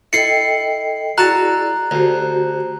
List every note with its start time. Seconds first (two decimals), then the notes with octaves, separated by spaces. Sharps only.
0.13 E4 A4 D#5 G5 C7 C#7
1.18 E4 F#4 G#4 D5 A5 A#5 F#6
1.91 D2 F#4 G4 C5